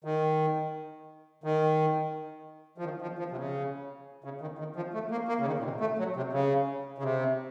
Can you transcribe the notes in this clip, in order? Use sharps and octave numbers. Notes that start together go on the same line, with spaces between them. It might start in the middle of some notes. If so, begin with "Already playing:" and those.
D#3
D#3
F3
D#3
F3
F3
C3
C#3
C#3
D#3
D#3
F3
A3
A#3
A#3
C#3
D#3
A#2
C3
A3
F#3
C3
C#3
C#3
C3